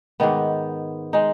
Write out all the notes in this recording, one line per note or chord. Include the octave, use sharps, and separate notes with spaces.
G#2 D#3 B3
G#3 D#4